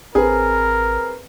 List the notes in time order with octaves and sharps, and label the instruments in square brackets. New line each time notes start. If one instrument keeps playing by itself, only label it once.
[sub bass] A1 [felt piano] C4 G#4 B4 [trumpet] A#4